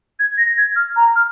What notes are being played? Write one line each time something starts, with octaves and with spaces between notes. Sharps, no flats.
G#6
A#6
G#6
F6
A#5
F6